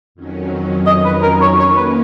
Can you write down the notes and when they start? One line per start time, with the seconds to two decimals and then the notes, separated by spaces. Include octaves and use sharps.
0.15 F2 D#3 F#3 C#4
0.87 D#5
1.05 B4
1.23 A#4
1.42 C#5
1.59 D#3 A#3 C#4 C#5
1.77 B4